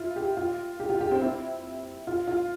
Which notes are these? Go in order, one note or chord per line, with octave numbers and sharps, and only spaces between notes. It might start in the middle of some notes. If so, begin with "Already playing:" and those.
Already playing: E4 F4
G4
F4
G4
F4
G4
C4
E4
F4
F4